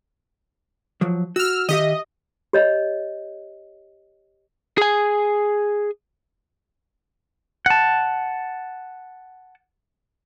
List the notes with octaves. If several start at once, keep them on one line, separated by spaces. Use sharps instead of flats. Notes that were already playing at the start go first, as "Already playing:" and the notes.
F3 F#3
F#4 E6 F6
D#3 G4 D#5 E5
G4 C#5 D#5
G#4 G#5
F#5 A5